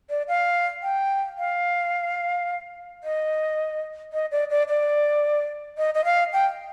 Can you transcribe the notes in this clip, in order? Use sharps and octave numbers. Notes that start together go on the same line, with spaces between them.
D5
F5
G5
F5
D#5
D#5
D5
D5
D5
D#5
D#5
F5
G5